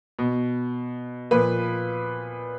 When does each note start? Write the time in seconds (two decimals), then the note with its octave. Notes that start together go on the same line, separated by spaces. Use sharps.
0.19 B2
1.31 A#2 F3 B4